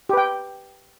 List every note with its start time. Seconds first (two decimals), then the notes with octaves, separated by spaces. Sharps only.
0.09 G4
0.13 B4
0.17 G5